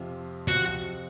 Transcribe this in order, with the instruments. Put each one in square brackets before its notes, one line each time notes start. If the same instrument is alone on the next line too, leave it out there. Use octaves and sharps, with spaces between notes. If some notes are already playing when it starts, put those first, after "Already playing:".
Already playing: [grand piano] F2 C3 F3
[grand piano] C3 F3 [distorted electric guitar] F#4